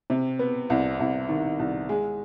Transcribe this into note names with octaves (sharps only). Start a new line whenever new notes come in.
C3
B3
C2
C2
D#3
C2
G#3